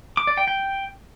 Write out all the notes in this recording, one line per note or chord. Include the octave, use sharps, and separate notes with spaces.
D6
D5
G5
G5